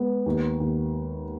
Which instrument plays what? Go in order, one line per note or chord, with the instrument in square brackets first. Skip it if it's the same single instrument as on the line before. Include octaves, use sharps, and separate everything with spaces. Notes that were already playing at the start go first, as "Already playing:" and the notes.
Already playing: [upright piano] G#3 B3
D#2
D#2